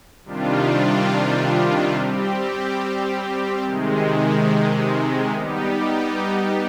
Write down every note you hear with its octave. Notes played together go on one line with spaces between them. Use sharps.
C3 D#3 G3 D4 F4
G3 C4 G4
C3 D#3 G#3
G3 B3 D#4 G4